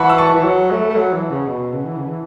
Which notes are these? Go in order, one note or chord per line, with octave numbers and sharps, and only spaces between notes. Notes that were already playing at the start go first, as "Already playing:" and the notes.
Already playing: E3 F#5 A5 B5 C#6
E6
A5 C#6
E3
F#3
A3
A3
F#3
E3
C#3
B2
C#3
E3
C#3
E3